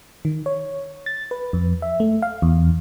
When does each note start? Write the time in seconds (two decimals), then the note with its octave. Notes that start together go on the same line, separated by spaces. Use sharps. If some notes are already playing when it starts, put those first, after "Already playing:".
0.25 D#3
0.46 C#5
1.06 A6
1.31 B4
1.53 F2
1.82 E5
2.00 A3
2.22 F5
2.42 E2